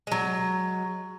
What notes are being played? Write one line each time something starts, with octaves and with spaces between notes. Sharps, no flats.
F#3 G#3